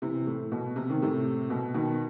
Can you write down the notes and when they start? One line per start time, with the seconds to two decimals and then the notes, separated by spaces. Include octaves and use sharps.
0.02 C3 E3
0.27 A2
0.52 B2
0.76 C3
0.90 D#3
1.02 A2 C3
1.50 B2
1.74 B2 D#3